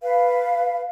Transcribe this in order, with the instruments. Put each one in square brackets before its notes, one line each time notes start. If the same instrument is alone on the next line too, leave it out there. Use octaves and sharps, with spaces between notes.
[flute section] B4 F5